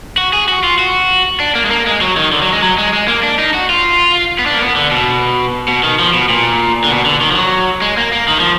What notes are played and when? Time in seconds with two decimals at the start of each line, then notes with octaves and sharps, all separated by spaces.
0.18 F#4
0.33 G#4
0.48 F#4
0.63 F4
0.79 F#4
1.40 D4
1.55 A#3
1.65 G#3
1.71 A#3
1.86 G#3
2.01 F#3
2.17 D#3
2.32 D3
2.42 F#3
2.52 G#3
2.63 F#3
2.78 G#3
2.93 G#3
3.08 A#3
3.23 D4
3.39 D#4
3.54 F#4
3.69 F4
4.39 B3
4.46 D4
4.54 A#3
4.61 B3
4.76 D3
4.91 B2
5.68 B2
5.84 D#3
5.99 F3
6.14 B2
6.29 A#2
6.84 D3
6.91 B2
7.05 D3
7.21 D#3
7.31 F3
7.36 F#3
7.82 G#3
7.97 A#3
8.13 A#3
8.28 D#3
8.40 F3